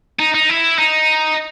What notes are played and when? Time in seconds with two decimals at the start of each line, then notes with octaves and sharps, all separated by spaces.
0.19 D#4
0.34 D#4
0.49 E4
0.79 D#4